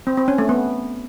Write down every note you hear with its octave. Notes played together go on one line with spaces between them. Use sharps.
C4
C4
C#4
A3
B3